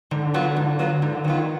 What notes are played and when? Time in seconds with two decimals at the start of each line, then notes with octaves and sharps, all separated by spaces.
0.11 G#2 D3
0.34 F#3 B3 F4
0.56 G#2
0.79 F#3 B3 F4
1.02 G#2 D3
1.24 D#3 F#3 B3 F4